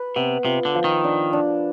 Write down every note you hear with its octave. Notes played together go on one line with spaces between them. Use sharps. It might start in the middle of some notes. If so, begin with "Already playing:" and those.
Already playing: B4
C3 B3
C3 F4
D3
F3
D#3
D4
D4